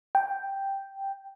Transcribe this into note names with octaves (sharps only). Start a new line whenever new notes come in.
G5